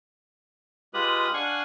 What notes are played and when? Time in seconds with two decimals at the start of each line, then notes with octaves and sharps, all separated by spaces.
0.94 G#3 F4 G4 B4 B5 D#6
1.34 D4 F5 F#5 G#5 C#6